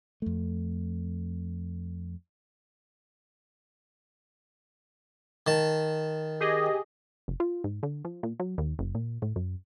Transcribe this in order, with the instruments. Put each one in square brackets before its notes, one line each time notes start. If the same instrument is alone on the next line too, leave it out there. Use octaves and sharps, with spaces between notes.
[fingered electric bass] F2 A3
[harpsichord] D#3 A5
[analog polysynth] G4 G#4 D#5
[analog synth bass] F#1
F4
G#2
D3
F3
A#2
F#3
D#2
F#1
A#2
A2
F#2